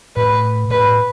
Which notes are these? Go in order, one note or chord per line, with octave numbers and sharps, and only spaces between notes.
A2 B4
A2 B4